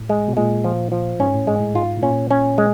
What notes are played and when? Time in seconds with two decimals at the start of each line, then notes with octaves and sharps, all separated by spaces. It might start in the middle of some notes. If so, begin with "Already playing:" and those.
Already playing: A2
0.09 G#3
0.28 B2
0.37 A#2 G#3
0.64 F3
0.92 F3
1.20 G#2 C#4
1.34 A2
1.47 G#2 G#3
1.60 A2
1.74 G#2 F4
1.97 A2
2.03 A#2 C#4
2.31 C#4
2.58 G#3